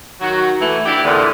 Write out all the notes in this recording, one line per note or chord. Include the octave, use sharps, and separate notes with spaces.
D#3 F#3 F#4
E3 A3
D4 E4 G4
E2 A#2 D3